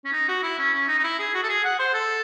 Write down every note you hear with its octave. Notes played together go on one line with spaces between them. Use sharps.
C#4
D#4
F#4
E4
C#4
C#4
D#4
D#4
E4
G#4
F#4
A4
G#4
F#5
C5
A4